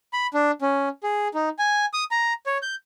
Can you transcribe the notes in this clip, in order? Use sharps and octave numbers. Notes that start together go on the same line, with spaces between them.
B5
D4
C#4
G#4
D#4
G#5
D#6
A#5
C#5
G6